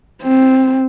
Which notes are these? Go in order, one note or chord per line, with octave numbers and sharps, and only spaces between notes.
C4